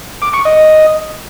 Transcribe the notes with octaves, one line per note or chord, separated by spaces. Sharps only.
D6
C#6
D#5